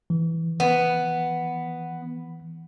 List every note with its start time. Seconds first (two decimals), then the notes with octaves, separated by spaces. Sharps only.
0.10 E3
0.60 B3